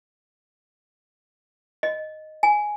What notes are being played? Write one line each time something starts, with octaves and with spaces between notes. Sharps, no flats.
D#5
G#5